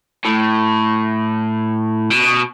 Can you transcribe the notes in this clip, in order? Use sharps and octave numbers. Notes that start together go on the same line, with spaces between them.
A2
B2